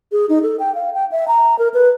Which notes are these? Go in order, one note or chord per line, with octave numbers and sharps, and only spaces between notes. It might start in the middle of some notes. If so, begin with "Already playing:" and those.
G#4
D#4
A4
G5
F5
G5
E5
A#5
A#4
B4